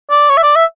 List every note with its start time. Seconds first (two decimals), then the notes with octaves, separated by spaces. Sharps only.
0.11 D5
0.29 C#5
0.37 E5
0.43 D5
0.56 E5